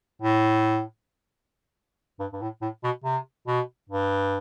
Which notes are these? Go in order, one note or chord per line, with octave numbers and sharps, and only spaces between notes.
A2
G2
G2
A2
A2
B2
C3
B2
G2